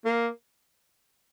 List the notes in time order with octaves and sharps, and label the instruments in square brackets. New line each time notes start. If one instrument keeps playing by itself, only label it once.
[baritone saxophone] A#3